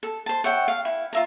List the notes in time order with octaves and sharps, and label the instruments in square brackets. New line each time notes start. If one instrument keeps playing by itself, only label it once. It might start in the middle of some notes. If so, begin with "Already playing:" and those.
[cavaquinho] A4
C5 A5
C#5 E5 F#5 G5
F5
E4
F4 E5 A#5